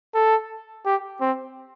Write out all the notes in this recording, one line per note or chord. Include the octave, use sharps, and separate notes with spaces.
A4
G4
C4